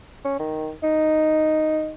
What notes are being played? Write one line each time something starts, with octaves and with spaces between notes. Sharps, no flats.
C#4
D#3
D#4